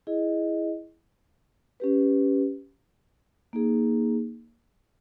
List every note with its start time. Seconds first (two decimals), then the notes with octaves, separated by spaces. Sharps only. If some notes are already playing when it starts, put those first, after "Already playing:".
0.07 E4 G#4 D#5
1.80 C#4 G4 B4
3.53 A#3 D#4 G#4